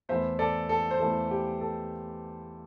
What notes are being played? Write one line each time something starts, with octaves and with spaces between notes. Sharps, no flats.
E2 E3 A3 E4 C5 E5
A4 D5
A4
C5
E2 E3 A3 E4 A4
G4
A4